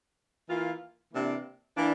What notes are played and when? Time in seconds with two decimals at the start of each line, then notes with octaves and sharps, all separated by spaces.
0.49 E3 A#3 F4
1.12 C3 E3 A#3 D4
1.76 E3 A#3 D4